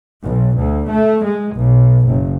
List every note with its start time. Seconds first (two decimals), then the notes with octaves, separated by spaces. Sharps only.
0.23 B1
0.58 D2
0.89 A3
1.25 G#3
1.57 B1
2.06 F#1